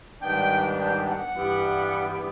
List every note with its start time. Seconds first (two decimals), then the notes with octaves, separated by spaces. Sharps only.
0.21 G#2 D#3 G3 B3 D4 G5
0.79 G5
1.07 F#5
1.35 G2 E3 G3 B3